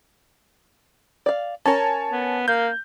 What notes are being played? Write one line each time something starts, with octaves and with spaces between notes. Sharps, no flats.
D5 F5
C#4 A#4 C#5 G#5 A5
B3
A#3 G6